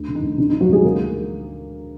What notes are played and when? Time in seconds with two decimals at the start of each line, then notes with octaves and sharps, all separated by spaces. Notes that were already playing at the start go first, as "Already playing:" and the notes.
Already playing: D2
0.08 D3
0.15 D#3 D#4
0.23 D2
0.38 D3 D4
0.49 D#3 D#4
0.53 D3
0.61 F#3 F#4
0.69 D2 G#3 G#4
0.84 D3 A#3 A#4